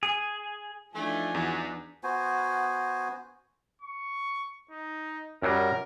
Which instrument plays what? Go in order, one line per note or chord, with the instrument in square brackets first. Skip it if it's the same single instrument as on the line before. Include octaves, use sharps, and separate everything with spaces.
[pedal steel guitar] G#4
[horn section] E3 A3 [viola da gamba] F3 D4 D#4 [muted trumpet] G#5
[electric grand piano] E2 [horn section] F#4
[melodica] B3 F#4 C5 G#5
[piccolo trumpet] C#6
D#4
[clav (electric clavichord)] F#2 F#3 G3 [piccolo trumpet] A#4